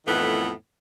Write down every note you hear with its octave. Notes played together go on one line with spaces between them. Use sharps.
F2 A2 D#3 E3 A3 B3